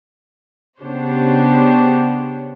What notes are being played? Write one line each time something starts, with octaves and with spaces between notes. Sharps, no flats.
C#3 B3 D4 G4 C5 C#5